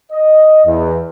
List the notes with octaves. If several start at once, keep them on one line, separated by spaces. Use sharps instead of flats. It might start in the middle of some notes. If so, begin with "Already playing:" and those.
D#5
E2